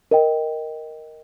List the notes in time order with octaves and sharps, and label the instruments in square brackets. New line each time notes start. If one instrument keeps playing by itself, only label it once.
[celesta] A#4 D#5 G5